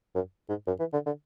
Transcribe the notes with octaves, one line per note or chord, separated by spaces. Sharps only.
F#2
G#2
F#2
E3
D3
D3